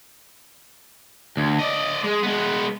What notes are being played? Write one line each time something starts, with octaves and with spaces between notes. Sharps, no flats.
D2
D5 D#5
G#3
G#3 B3